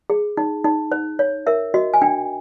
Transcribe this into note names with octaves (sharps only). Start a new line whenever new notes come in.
G#4
D#4
D#4
C5
C#5
A#4 E5
F#4 D#5
G#5
D4 G5